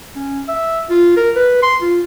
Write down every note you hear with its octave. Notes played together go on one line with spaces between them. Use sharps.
C#4
E5
F4
A#4
B4
C6
F4